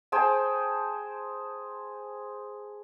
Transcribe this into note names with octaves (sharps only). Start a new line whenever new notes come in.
G#4 C5 G5 A5